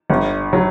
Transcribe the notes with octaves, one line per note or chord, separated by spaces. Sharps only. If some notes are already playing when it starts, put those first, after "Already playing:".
G1
F#3